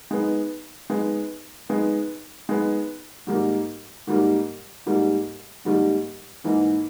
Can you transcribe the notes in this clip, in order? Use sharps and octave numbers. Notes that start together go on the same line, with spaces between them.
G#3 B3 D#4
G#3 B3 D#4
G#3 B3 D#4
G#3 B3 D#4
G#2 D#3 G3 A#3
G#2 D#3 G3 A#3
G#2 D#3 G3 A#3
G#2 D#3 G3 A#3
G#2 E3 A#3 D#4